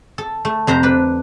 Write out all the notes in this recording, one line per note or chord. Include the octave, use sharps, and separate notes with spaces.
A4
A3
F2 C3 C5 A#5
D4 B4